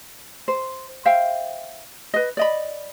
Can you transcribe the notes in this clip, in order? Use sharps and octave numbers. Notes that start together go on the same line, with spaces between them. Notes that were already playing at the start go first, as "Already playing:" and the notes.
C5
C5 E5 F5 G5
B4 D#5
D5 D#5 B5